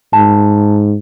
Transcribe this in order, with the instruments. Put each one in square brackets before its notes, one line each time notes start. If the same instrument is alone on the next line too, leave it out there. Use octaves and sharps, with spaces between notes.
[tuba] G#2 [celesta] A5